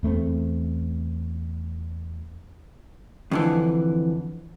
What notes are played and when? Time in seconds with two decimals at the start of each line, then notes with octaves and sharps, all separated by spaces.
0.03 E2 A3 A#3 C4
3.31 F2 D3 E3